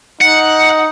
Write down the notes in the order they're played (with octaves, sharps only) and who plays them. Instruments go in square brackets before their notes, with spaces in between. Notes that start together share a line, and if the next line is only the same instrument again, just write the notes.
[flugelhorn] D#4 [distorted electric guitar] F#5